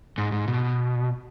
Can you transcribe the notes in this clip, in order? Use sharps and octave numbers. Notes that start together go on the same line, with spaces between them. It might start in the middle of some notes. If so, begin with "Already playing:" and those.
G#2
G#2
B2